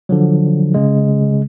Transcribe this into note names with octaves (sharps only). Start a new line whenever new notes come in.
D3 F3 F#3
C#3 G#3